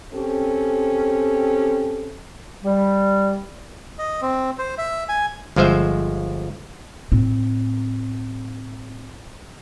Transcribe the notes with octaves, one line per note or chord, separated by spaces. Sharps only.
C4 C#4 G4 A4
G3
D#5
C4
C5
E5
G#5
G1 F3 G#3 C5 E5
A2 C4